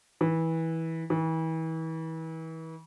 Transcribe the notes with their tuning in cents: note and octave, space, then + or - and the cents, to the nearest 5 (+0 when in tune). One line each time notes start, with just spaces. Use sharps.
E3 -20
E3 -35